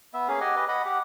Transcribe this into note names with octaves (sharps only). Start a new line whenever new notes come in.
B3 E5
A#3 C#4 G#4 F5
G4 D#5 F#5 G#5
G4 B4 D#5
D#5 F#5 B5
G4 F#5